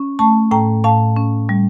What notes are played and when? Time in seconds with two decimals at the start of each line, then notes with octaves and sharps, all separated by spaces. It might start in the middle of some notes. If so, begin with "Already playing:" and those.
Already playing: C#4
0.19 A3 A5 C#6
0.51 A2 G5 A#5
0.84 A2 F5 A5
1.17 C#4
1.49 G3